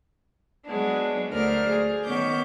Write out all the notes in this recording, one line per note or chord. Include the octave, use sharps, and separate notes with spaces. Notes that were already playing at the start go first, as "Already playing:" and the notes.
F#3 G#3 B3 D4
D2 A#4 C5 D5 F6
G#4
D#3 B3 C#4 D6 G6